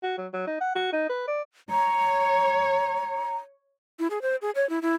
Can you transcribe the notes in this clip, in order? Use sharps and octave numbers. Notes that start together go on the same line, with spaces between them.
F#4
F#3
F#3
D#4
F#5
F#4
D#4
B4
D5
C#5 A#5
E4
G#4
C5
G#4
C#5
E4
E4